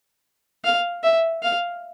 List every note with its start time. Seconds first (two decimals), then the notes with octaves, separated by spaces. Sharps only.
0.65 F5
1.04 E5
1.43 F5